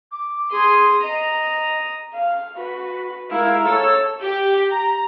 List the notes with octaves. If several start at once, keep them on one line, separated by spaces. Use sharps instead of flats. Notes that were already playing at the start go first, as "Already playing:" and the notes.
D6
G#4 C6 D#6
D#5 A#5 D#6
F5
F#4 B4
G#3 E4 A#4 F5
A4 C#5 E6
G4
A#5